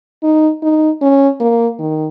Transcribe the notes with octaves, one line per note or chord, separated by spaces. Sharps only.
D#4
D#4
C#4
A#3
D#3